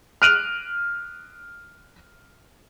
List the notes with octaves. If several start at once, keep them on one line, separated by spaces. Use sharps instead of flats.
F6 F#6 D7 D#7 F7 F#7